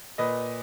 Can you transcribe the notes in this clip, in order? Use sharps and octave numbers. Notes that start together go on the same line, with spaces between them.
A#2 B4 D#5